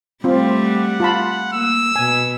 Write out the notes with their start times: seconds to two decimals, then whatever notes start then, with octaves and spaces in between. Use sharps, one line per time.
0.24 G3 A3 C4 F4
0.64 F#5
1.00 F4 A5 B5
1.52 A#3 E6
1.96 B2 G#5